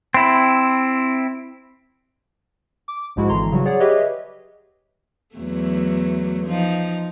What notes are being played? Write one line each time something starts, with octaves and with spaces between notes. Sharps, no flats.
C4 E4
D6
A#1 G#2 F3 G#3 E4 F#4
G#1 D3 E3 A#5 C6
C#3 F#3 G3 F#4
G#4 C#5 D5 F#5
G4 G#4 B4 C#5 D#5 E5
E2 F#3 A3
F3 D#4